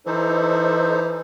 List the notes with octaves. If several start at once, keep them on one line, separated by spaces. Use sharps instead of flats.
E3 D#4 A4 C5